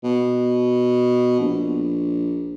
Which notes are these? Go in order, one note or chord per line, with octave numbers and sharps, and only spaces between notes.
B2
A#1